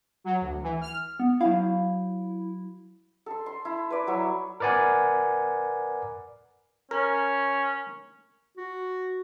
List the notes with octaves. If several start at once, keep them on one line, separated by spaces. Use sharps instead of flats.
F#3
D2
E3
F6
B3
F#3 E4 F5
A4 C6
C6
E4
B4 D5
F#3 E4 C#5
A#4 B4 D5 F#5 G#5
C#4 A#4
F#4